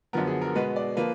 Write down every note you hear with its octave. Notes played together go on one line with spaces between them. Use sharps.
F#2 D3 F3 B3 A#4
G#4
A#4
B2 G#3 B3 B4
D5
F3 A#3 B4